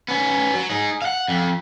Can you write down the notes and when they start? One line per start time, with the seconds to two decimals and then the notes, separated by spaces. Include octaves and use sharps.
0.08 B3 C#4
0.54 F#3
0.70 D#4 G#4
1.02 F5 F#5
1.28 F2